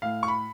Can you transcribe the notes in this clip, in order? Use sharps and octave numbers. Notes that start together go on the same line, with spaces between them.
A2 F5
C#6
B5